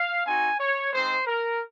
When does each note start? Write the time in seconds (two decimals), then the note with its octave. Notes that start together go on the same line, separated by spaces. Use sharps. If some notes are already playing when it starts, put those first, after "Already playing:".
Already playing: F5
0.25 C4 D#4 F#4 G#5
0.59 C#5
0.92 G#3 C4 D#4 C5
1.26 A#4